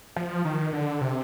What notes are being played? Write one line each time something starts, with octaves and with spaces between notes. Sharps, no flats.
F3
D#3
D3
C3